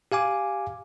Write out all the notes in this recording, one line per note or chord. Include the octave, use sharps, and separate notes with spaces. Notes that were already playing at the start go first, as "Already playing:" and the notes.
G4 F5 G#5 D6